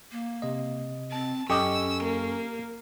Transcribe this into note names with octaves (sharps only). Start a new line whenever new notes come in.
A#3
C3 D#5
C4 A5
F#2 C#4 G4 A4 D#5 C#6 E6
A#3